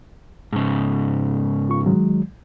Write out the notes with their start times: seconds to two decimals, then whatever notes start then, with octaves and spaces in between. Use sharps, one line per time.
0.52 G#2 C#3
1.69 F4 C#6
1.85 D#3 F#3 G#3